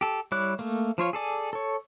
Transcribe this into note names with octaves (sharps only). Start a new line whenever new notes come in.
G4 A4
G3 E4 C#5 D6 F#6
A3 A#3
F3 F4 C#5
G#4 A4 D5 G#5
A4 C#5